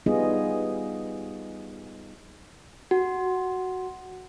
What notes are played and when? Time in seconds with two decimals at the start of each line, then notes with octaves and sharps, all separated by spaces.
0.06 G3 B3 D#4 F4 G#4 D#5
2.91 F#4